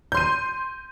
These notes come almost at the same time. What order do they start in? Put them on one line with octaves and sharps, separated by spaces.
G6 C6 D#7